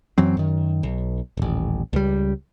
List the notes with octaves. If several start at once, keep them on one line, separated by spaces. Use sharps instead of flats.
F#2 E3 F#3 C4
F#2 D#3
B1
D#1 A1
C#2 G3